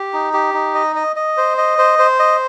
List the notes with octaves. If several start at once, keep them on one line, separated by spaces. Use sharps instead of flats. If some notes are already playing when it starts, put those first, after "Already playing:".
Already playing: G4
D#4
G4
D#4
D#5
D#5
D#5
C5
D#5
C5
C5
D#5